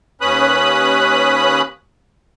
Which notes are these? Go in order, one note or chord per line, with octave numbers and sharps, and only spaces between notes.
D#2 C#4 B4 B5 D#6 F#6